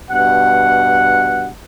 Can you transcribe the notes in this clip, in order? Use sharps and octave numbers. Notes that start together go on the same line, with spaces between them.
G2 B2 F#5